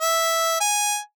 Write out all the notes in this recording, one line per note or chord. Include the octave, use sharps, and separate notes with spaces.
E5
G#5